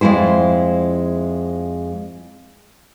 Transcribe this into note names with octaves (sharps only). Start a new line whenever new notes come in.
F2 C3 G#3 E4 C5